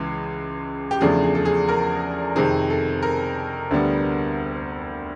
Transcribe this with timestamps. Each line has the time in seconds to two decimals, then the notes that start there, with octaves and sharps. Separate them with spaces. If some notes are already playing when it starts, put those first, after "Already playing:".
Already playing: C#2 C#3 E3 G#3
0.91 G4
1.01 E2 C#3 F3 A3 D4 G#4
1.23 G#4
1.35 A4
1.45 G#4
1.68 A#4
2.36 F2 C3 D#3 G#4
2.70 A4
3.03 A#4
3.71 D2 D3 G3 B3